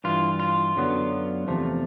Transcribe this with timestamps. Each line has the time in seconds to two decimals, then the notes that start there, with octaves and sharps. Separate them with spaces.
0.04 G2 E3 F4
0.40 F4
0.76 F#2 D3 F#3 B3
1.47 E2 C3 F3 A3